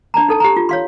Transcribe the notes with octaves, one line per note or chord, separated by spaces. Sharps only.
D4 D5 A5 A#5
D#4 A4 A5
G4 A#5
F4
C#5 F5 C6